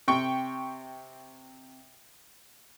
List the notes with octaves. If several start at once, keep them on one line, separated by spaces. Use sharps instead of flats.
C3 G5 C#6